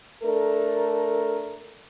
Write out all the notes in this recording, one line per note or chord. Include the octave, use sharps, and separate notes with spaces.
A3 D4 A4 A#4